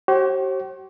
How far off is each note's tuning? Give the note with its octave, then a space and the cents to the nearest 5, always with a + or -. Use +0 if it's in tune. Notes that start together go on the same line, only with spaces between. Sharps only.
G4 -45 C5 +45